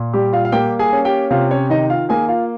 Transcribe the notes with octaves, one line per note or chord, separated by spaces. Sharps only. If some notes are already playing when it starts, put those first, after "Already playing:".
Already playing: A#2
G3 G4
F4 F5
F5
A#3 G4 G5
G#4 G#5
C#4
G4 G5
C3 F4 F5
C#4 C#5
D#3 D#4 D#5
F4 F5
A#3 G#4 G#5
F4 F5